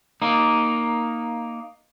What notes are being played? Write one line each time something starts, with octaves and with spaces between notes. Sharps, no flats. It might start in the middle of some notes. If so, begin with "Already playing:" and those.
A#3 D#4